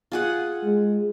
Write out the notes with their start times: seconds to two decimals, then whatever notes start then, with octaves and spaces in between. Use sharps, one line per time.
0.12 F4 G#4 F#5
0.63 G#3